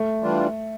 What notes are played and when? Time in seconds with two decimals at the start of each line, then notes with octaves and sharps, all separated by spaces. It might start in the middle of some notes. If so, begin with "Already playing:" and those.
Already playing: A3
0.23 E3 G3 D4 F4